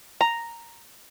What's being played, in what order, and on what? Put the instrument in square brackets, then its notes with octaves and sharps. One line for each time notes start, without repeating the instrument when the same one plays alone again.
[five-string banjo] A#5